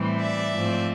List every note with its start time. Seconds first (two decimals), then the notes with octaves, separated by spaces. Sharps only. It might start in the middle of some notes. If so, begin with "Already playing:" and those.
Already playing: A2 E3 G3 C4
0.21 D5 E5
0.52 G#2 F3 A3 C4